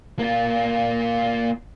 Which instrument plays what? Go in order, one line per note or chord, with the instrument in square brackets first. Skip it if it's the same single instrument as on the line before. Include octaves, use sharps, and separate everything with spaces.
[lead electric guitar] A#3 F4